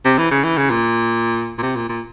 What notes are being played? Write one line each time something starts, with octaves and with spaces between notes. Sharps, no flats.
C3
E3
C#3
E3
C#3
A#2
A#2
C3
A#2
A#2